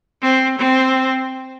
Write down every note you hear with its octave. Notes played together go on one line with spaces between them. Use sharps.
C4
C4